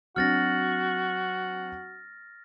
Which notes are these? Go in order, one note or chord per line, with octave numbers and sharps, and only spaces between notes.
F#3 C4 D4 F#4 F6 A6 A#6